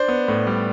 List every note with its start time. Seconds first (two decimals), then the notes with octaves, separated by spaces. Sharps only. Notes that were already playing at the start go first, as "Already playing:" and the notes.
Already playing: D4 C5
0.08 B3
0.28 A2
0.47 G3